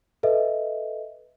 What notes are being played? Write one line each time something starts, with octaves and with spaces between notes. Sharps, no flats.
A4 B4 D#5 E5